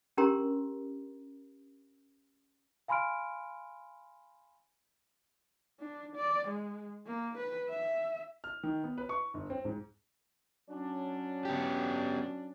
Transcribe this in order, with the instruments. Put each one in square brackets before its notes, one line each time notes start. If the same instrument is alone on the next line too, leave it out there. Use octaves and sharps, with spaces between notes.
[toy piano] C#4 D4 G4 A#4 A#5 C6
[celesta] F5 G#5 B5 C6 F6 D7
[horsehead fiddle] D4
D5
G#3
A#3
B4
E5
[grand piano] F6
D#3
B3
B4
C#6
G1
C4
G#2
[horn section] F#3 C#4 D4
[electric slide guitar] B3 G4